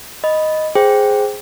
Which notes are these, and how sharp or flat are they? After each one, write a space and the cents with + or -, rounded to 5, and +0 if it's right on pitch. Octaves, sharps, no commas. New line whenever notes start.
D#5 +0 B5 +0
G#4 +0 C5 +0 G5 +0